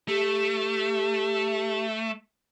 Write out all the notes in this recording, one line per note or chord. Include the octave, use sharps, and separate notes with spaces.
A3 G4